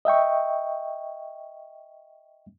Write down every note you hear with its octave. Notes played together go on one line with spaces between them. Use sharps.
D#5 E5 G5 C#6